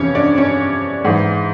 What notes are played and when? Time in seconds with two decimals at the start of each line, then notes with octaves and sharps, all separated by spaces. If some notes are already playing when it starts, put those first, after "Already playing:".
Already playing: F2 C3 E3 C#4 C#5
0.15 D4 D5
0.38 C#4 C#5
1.05 G#2 E3